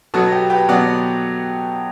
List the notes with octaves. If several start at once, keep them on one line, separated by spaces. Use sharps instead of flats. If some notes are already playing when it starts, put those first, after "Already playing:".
B2 F#3 B3 F#4 A4
G4
G4 B4
B2 F#3 B3 D5 F#5